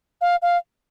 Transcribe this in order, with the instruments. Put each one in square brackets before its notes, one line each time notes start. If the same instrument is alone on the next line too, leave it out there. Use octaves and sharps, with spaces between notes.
[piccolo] F5
F5